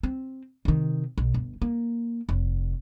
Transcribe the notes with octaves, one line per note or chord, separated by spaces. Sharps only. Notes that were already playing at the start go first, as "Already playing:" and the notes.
C4
C3 D#3
B1
G1
A#3
F1